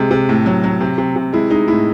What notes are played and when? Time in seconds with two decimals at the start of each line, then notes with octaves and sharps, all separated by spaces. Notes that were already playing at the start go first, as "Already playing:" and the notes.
Already playing: C3 G#3
0.11 C3
0.29 A2
0.46 F#3
0.64 F#3
0.81 C3
0.98 C3
1.16 C3
1.33 G#3 E4
1.50 G#3 D#4
1.68 A2 E4